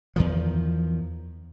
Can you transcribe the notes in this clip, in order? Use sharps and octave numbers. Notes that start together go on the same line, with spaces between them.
E2 D#3 F3